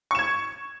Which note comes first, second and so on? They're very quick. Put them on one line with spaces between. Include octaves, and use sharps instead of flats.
C#6 E7 G#6